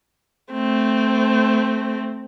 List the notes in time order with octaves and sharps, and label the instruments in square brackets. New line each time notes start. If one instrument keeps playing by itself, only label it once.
[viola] A3 C4